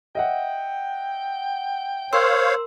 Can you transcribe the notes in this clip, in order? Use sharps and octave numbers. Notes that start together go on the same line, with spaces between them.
D#5 E5 F#5 G5
A#4 C5 C#5 F5 C6 E6